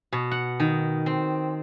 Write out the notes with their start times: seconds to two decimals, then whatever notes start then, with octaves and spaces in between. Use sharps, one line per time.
0.13 B2
0.31 F#5
0.60 D#3
1.06 C4